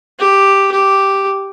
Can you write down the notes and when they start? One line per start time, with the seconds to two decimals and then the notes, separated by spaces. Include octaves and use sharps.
0.19 G4
0.72 G4